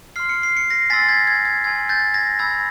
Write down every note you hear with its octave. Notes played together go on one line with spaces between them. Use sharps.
C6 F6 C7
C#7
C7
C#7
A#6 C7
G#5 C6 E6 A6 B6
A6
G#6 A#6
G#6
G#6
G#5 C6 E6 G#6
G6 A6
G#6 A#6
B5 E6 G6 G#6 A#6